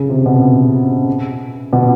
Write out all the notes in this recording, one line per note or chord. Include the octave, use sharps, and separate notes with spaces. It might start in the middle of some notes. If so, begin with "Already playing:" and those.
Already playing: C#3
C3
B2
B2